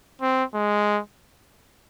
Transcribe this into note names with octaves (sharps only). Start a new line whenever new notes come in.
C4
G#3